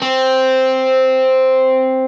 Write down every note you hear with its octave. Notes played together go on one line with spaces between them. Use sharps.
C4